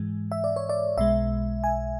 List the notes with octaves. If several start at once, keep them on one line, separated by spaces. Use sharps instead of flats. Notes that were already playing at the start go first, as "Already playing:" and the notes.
Already playing: G#2 E3 G#3
E5
D5
C#5
D5
B1 B2 G#3 E5
G#5